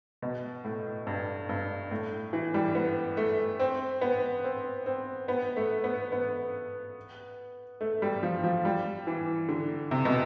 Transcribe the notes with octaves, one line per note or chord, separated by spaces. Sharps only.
B2
A2
G2
G2
A2
E3
G3
B3
A3
C4
B3
C4
C4
B3
A3
B3
B3
A3
G3
F3
F3
G3
E3
D3
C3
B2